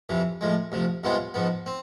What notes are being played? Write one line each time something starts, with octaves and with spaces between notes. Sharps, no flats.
F2 C3 E3
A2 F3 G#3
D2 C3 F3
C2 C3 G#3 B3 F4
G#2 F3 B3
C4